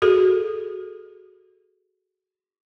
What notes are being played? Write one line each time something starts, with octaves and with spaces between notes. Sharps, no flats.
F#4 G#4 A4